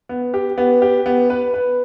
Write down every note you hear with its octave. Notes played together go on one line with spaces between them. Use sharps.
B3
G4
B3
G4
B3
B4
B4